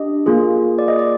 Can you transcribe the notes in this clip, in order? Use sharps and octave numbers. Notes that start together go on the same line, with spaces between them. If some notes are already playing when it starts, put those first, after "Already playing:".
Already playing: D4 G4 D#5
A#3 F4 G#4
D5
D#5
D5